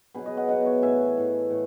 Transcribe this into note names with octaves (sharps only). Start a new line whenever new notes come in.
B2 F#3 G#4 B4
B4 D#5
D#5 F#5
B2 F#3 D#5 F#5
C#5 E5
A2 E3 E5 G#5
A2 E3
A2